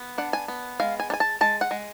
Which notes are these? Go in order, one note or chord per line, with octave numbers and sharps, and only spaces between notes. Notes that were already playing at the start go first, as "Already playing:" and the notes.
Already playing: B3
D4 F#5
G#5
B3
G#3 F5
G#5
D4
G#5
A5
G#3 A5
F#5
G#3